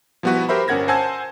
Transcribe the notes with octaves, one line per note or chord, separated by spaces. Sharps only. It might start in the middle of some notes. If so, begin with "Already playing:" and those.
F3 G3 B3 E4 F#4 B4
G4 A#4 C5 E5 B5
G1 C#4 A#4 F#5 G#6 A#6
C5 F#5 G#5 A5 E6 G#6